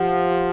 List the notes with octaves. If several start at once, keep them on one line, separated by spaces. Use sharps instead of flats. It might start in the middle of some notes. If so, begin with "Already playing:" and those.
Already playing: F3 G4 F#5
G4